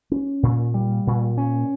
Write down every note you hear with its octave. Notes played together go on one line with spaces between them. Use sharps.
C#4
A#2
G3
A#2
C#4